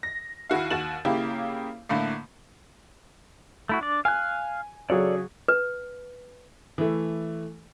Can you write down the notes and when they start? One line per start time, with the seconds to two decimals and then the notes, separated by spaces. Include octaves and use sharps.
0.03 A#6
0.50 D#2 E4 F#4 F5
0.71 D#2 F#4 A6 E7 F#7
1.05 C#3 A#3 E4 G4
1.89 A2 D3 A3 A#3
3.69 A3 E4 F#4
3.81 D4 D5
4.05 F5 G#5 F#6
4.90 C#3 F#3 G#4 A4 C#5 D5
5.48 B4
6.78 E3 A3